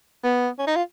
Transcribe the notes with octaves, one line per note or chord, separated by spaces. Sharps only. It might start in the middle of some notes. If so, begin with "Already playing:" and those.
B3
C#4
D#4
F4